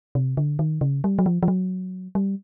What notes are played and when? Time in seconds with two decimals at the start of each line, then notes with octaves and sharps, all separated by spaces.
0.15 C3
0.37 D3
0.59 D#3
0.81 C#3
1.04 G3
1.19 F#3
1.26 F3
1.43 F3
1.48 F#3
2.15 G3